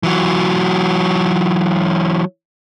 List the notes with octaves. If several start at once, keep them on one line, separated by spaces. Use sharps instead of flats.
E3 F#3